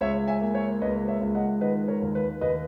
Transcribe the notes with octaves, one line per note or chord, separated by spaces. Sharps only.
C#2 C#5 E5
E5 G#5
A#3
C#5 E5
C#2 B4 D#5
C#5 E5
C#2
D#5 F#5
D#3 B4 D#5
A#4 C#5
D#2
B4
D#2 B4 D#5